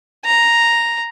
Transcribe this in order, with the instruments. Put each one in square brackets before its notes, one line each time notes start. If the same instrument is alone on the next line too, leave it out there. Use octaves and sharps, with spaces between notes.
[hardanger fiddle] A#5